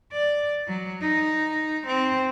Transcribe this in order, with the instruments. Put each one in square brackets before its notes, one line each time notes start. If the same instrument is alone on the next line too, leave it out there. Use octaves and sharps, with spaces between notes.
[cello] D5
F#3
D#4
C4